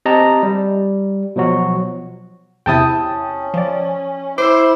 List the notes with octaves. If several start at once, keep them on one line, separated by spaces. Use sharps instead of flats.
C4 G4 D#5 A5 A#5
G3
B2 F3 F#3 F#4
E2 C3 E4 G5 A5 D#6
C#4
F3 D5
E4 C5 D6 E6